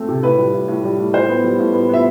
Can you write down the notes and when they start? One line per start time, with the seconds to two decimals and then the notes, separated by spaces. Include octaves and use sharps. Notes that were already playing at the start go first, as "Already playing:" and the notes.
Already playing: A3 C4
0.09 C3
0.23 A2 B4
0.39 G3
0.54 A2
0.68 A2
0.84 G3
0.99 A2
1.13 A2 C5
1.29 B3
1.44 G3
1.59 A2
1.73 B3
1.89 B3 E5